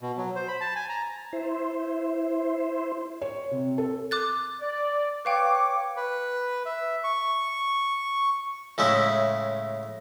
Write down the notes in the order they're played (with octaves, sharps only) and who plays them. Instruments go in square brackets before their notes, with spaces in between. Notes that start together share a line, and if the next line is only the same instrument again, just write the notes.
[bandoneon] B2
F#3
C5
B5
A5
G#5
A#5
[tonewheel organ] E4 C5
[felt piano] C#5
C3
A4
[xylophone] D6 F#6 A6
[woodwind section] D5
[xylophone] B4 F5 G5 [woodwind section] C#5 C#6 D6
[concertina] B4
E5
C#6
[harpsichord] A2 C#3 G#3 E4